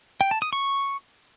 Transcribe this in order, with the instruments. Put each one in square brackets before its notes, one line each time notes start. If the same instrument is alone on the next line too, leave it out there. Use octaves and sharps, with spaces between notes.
[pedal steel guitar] G5
A5
D#6
C#6